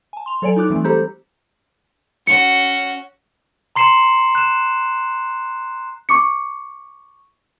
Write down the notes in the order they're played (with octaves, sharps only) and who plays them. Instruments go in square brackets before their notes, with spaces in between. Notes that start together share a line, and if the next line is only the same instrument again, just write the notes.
[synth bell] G#5 A5
C6 F7
F#3 A4 C#5 D5 G#5 D7
D#4 F4 D6 F#6
E3 G3 A3 C4
G4 A4 C5 A#5 B5 G6
[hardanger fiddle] C#4 F#4 [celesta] C#7
[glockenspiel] A#5 C6 C7 C#7 E7 F#7
F#6 E7
[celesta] C#6 D6 C#7